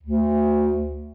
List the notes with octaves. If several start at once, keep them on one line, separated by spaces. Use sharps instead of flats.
D2